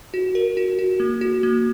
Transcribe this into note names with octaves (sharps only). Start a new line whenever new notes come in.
F#4
A#4
F#4
F#4
A#3
F#4
A#3